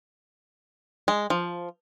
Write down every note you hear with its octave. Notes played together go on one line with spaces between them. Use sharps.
G#3
F3